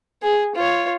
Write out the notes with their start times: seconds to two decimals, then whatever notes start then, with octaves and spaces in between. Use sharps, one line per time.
0.23 G#4
0.55 F4 C#5